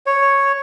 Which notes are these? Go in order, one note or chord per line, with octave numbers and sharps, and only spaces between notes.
C#5